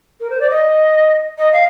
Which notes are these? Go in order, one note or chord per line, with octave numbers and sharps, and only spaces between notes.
A#4
C5
D5
D#5
D#5
F5